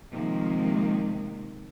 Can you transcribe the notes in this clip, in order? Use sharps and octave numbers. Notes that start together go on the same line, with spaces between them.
C3 D#3 F3 G#3 A#3